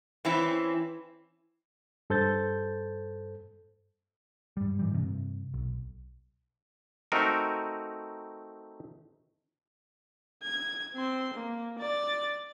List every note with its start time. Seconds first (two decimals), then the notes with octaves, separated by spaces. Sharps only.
0.25 E3 C4 C#4 E4
2.10 G2 A4 C5 G6 A6
4.57 G2 G3
4.79 G#2 E3 G3
4.94 G2 C3
5.54 B1
7.12 A3 C4 D#4 F#4 A#4
10.43 G#6
10.94 C4 C6
11.34 A#3
11.79 D5 A6